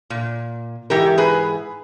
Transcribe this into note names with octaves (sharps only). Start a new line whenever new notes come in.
A#2
G#2 E3 G4 A#4
G#4 B4